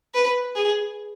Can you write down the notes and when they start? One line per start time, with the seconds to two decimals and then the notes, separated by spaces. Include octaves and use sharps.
0.14 B4
0.56 G#4